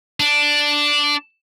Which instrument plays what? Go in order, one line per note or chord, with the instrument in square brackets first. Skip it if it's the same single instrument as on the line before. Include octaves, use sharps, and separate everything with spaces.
[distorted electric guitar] D4